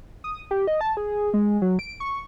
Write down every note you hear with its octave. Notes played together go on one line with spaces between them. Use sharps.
D#6
G4
D#5
A5
G#4
G#3
F#3
D7
C#6